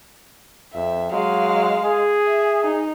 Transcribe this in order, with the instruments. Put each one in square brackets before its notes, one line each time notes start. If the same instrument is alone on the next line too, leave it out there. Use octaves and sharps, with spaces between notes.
[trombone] F2 [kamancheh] E5
[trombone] F#3 [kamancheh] G#3 F5
[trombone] G#4
[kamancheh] E5
D#4